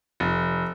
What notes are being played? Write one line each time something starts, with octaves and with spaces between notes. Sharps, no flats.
F1